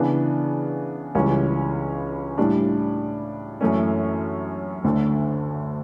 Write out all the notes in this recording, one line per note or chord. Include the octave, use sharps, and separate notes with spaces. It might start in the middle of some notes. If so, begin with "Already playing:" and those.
Already playing: C#3 E3 B3 D4
C#2 C#3 E3 G3 C#4
A2 G3 D4
F#2 E3 A3 C#4
D2 D3 A3